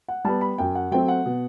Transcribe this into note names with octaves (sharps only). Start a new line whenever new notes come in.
F#5
G3 B3 A5
B5
F#2 G5
F#5
F#3 A3 C4 G5
F#5
B2